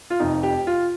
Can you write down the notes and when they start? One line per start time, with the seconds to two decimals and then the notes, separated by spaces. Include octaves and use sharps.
0.10 F4
0.20 F1 F2 C3 D#4
0.43 G4
0.67 F4